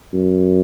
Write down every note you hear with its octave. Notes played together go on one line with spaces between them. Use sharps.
F#2